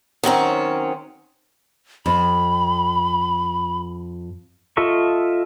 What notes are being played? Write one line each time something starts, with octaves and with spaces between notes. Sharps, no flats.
D#3 F#3 C4 C#4
F2 B5
F4 A4 D#5 E5 C#6